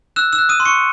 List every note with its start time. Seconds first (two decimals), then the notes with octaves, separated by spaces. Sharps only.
0.16 E6 F#6 E7
0.33 E6 E7
0.39 F#6
0.49 D#6 D#7
0.60 C6
0.65 C#6 C#7